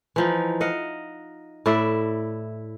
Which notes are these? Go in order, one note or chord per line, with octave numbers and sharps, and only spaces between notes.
E3 F3 D#4
D#5 F5 F#5
A2 E4 D5 E5